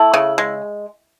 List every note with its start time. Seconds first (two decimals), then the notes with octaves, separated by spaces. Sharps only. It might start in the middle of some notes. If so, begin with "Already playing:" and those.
Already playing: A3 E4
0.14 C#3
0.38 G#3